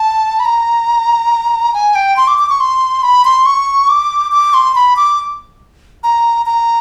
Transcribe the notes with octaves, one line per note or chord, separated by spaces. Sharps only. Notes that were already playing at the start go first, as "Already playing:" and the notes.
Already playing: A5
B5
A#5
G#5
G5
C6
D6
D6
C#6
C6
B5
C6
C#6
D6
D6
C6
B5
D6
A#5
A#5